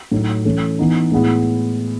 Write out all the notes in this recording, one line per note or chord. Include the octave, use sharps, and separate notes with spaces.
A2 F#3 A3 D#4
E3 A3 C#4
E3 B3 D#4
A2 G#3 B3 E4